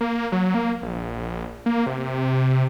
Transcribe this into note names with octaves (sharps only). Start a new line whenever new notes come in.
A#3
F#3
A#3
A#1
A#3
C3